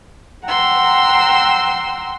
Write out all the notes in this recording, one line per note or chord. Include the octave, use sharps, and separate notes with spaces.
F#5 G5 A#5 C6 E6